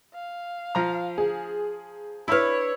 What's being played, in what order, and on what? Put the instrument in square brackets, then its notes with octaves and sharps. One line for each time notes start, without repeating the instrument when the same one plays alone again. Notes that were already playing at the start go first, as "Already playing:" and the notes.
[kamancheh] F5
[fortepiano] F3 A#5
[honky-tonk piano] G#4
[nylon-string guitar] D4 B4 [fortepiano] E4 F6 [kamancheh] C#5